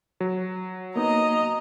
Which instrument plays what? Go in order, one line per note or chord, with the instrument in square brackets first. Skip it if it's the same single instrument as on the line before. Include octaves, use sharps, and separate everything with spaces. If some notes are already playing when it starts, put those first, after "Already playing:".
[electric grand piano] F#3
[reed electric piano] A#3 B3 D#4 [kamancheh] D#5 A#5